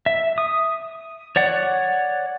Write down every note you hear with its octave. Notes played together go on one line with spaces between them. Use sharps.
E5
D#6
C#5 D5 F#5